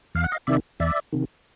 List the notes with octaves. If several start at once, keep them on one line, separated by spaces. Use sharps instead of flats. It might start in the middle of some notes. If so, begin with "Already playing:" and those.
E2 F5
F#5
D#5 F5
C3 D#3 D5 E5
E2 D5 E5
C3 D#3